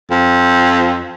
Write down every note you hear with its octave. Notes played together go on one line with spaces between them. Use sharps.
F2